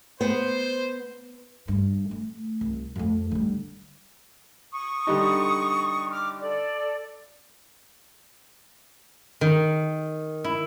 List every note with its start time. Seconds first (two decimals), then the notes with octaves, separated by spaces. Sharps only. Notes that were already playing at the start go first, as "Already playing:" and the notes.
0.21 B3 C5
1.68 G2
2.11 A3
2.61 C2
2.96 F2 A3
3.32 D3 G3
4.73 C#6 D#6
5.07 D3 G3 D#4
6.11 D6 F6
6.41 A4 D5
9.41 D#3
10.44 E4